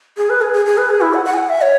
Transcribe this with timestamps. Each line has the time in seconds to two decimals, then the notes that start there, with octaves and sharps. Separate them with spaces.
0.17 G#4
0.30 B4
0.41 G#4
0.53 G#4
0.66 G#4
0.78 B4
0.90 G#4
1.01 E4
1.14 F#5
1.25 F#5
1.34 G#5
1.38 F#5
1.49 E5
1.62 C#5